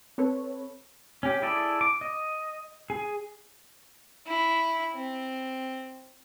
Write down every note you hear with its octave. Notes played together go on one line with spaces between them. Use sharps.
C4 A4 B4 C#5
C#4 G4
E4 G#4 A4 D5
D6
D#5
G#4
E4
C4